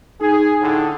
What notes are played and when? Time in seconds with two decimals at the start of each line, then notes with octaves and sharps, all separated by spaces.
0.21 D#4 G#4
0.62 A2 D3